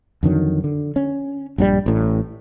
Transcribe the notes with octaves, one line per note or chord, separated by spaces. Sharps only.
F2 D3 D#3 F#3
D3
C#4
A#1 G2 F3 G3
A1 A2